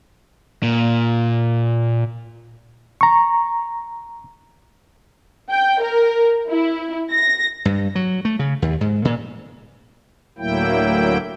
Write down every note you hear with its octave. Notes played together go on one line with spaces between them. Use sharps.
A#2
A#5 C#6
G5
A#4
E4
A#6
G2
F#3
A3
C#3
D#2
G#2
A#2
D2 A2 F#3 A#3 E4 G5